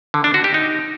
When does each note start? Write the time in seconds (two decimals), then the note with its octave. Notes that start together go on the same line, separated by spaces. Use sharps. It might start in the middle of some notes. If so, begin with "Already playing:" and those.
0.14 D3
0.24 D4
0.34 F#4
0.44 G4
0.54 D#4